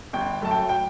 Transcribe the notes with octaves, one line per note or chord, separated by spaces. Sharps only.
G1 G5
F#2 F#3 A3 A5
G5
G5